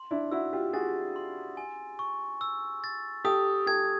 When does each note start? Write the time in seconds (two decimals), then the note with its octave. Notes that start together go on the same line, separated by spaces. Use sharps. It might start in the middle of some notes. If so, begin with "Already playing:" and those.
Already playing: C6
0.11 D4 E4
0.32 E4 F#4 E6
0.53 F4 G4
0.73 F#4 G#4 A6
1.16 C6
1.57 G#5
1.99 C#6
2.41 E6
2.84 A6
3.25 G4 A4 D#6
3.66 G4 A4 G#6